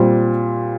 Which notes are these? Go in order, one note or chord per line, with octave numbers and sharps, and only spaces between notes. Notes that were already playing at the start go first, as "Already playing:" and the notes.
Already playing: A#2 G3 C4